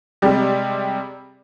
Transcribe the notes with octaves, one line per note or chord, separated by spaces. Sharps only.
C3 G3 G#3